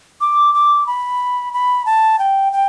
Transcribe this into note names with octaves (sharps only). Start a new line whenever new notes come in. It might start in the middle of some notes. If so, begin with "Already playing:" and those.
D6
D6
B5
B5
A5
G5
G5